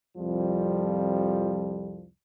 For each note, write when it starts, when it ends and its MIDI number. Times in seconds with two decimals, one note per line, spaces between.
0.18 2.07 36
0.18 2.07 41
0.18 2.07 53
0.18 2.07 55